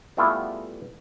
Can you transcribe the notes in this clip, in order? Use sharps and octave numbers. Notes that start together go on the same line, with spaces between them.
G3 A3 B3 E4 F4 G#4